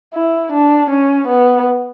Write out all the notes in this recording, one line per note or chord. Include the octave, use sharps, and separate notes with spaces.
E4
D4
C#4
B3